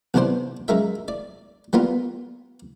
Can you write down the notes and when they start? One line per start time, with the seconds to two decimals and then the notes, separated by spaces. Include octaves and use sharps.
0.14 B1 C3 E3 D4 C5 C6
0.68 F#2 G#3 A#4 E5
1.08 D5
1.73 G3 A#3 B3 F4